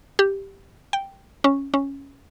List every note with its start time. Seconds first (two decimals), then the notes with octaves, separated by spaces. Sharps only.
0.19 G4
0.93 G5
1.44 C#4
1.74 C#4